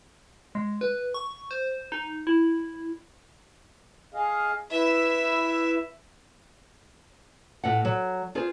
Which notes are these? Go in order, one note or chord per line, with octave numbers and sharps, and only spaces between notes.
G#3
B4
C#6
C5
D#4
E4
G#4 D#5 F5
E4 B4 E5
A2 F#5
F#3
F4 G#4 C5